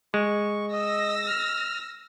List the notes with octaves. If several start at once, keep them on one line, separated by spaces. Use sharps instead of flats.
G#3 C#6
D#5 E6 A#6
F6